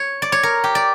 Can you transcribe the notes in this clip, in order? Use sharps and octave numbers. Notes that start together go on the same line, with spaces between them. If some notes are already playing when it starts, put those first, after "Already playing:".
Already playing: C#5
D5
C#5
A#4
G4
D5